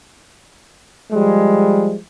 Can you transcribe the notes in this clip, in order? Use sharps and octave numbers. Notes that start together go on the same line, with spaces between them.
F3 G3 G#3